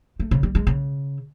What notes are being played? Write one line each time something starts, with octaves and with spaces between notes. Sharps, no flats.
A3
C#3
G3
G#3
C#3